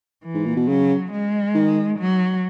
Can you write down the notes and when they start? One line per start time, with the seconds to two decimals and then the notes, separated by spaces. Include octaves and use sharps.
0.24 E3
0.34 G#2
0.46 A#2
0.56 B2
0.68 C#3 F#3
1.11 G#3
1.55 D#3
1.98 F#3